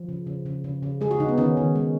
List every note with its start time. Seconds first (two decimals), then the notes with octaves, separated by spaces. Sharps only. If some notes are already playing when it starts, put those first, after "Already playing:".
Already playing: F3
0.09 C#3
0.27 C#3
0.46 C#3
0.64 C#3
0.83 C#3
1.01 G#3 G#4
1.11 F#4
1.20 C#3 D#4
1.29 B3
1.38 D#3 C#4
1.57 D#3
1.75 G#3